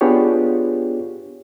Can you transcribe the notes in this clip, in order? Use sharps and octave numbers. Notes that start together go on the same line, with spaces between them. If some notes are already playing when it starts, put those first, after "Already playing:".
B3 D4 F4 G4 G#4 C#5